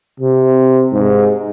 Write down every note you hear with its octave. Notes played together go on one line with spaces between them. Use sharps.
C3
G#2